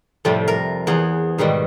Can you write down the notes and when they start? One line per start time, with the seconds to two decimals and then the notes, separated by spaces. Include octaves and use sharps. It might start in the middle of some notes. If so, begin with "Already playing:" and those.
0.25 F2 A2 C3 F3 G3
0.48 A#4
0.87 E2 B3 G#4 F5
1.38 G#2 B2 D#3 G3